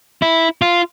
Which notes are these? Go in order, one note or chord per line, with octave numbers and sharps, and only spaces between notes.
E4
F4